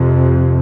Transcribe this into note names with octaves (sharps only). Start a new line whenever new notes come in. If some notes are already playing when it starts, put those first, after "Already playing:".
Already playing: F2 C3